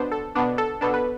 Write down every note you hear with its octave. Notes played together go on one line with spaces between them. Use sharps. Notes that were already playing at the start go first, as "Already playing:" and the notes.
Already playing: B2 B3 D4 C5
A4
B2 B3 D4
A4
B2 B3 D4 A4
B4